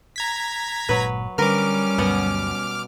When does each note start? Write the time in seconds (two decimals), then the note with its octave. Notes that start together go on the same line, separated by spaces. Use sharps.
0.16 A#5 G#6 B6
0.89 G1 A#2 F#3 G#3 B4
1.38 D3 G3 C#4 A#4 B4 D6 F6
1.98 D2 G2 B2 F#3 B3 F#5